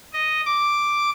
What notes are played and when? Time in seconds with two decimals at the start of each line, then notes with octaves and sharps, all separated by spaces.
0.13 D#5
0.46 D6